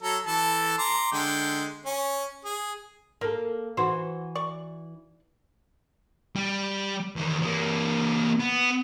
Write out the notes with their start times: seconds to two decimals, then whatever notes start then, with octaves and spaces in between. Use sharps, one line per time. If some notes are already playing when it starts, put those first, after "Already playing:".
0.02 F#3 A4 A#5
0.26 E3 A4 A5
0.78 A#5 C6 D6
1.12 D3 G#3 G5
1.85 C#4
2.45 G#4
3.21 A#3 A4 A#4
3.77 E3 F#4 C5
4.35 D5 C#6
6.36 G3
7.16 E2 D#3
7.41 E3 A#3
8.40 B3